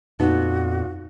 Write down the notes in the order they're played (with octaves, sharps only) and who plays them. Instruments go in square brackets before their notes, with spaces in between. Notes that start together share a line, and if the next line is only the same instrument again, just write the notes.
[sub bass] F2 [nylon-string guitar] A#2 B3 [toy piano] D#4 [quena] F#4